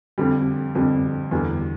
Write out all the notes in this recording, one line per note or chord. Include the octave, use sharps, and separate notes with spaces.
F2 D3 G3
F2 D3 G3
E2 D3 G3